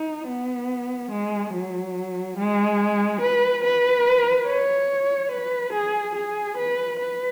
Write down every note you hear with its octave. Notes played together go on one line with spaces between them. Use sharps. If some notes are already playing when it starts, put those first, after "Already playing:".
Already playing: D#4
B3
G#3
F#3
G#3
B4
B4
C#5
B4
G#4
G#4
B4
B4